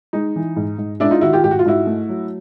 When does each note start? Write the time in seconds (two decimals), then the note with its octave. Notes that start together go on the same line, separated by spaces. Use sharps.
0.13 G#3 D#4
0.36 E3
0.56 G#2
0.78 G#2
1.00 G#3 D4 E4
1.11 D#4 F4
1.21 D#3 E4 F#4
1.32 F4 G4
1.44 G#2 G4
1.51 F#4
1.59 F4
1.66 G#2 E4 F#4
1.87 A3
2.09 F#3